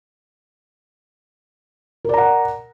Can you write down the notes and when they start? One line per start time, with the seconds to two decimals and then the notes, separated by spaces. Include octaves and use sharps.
2.05 A#4
2.09 D5
2.14 A#5
2.18 F#5